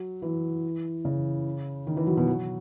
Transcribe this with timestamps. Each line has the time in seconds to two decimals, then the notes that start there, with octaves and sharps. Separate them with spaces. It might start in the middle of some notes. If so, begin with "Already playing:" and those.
Already playing: F#3
0.22 E3
1.05 C#3
1.87 D#3
1.97 E3
2.07 F#3
2.17 B2
2.27 F#3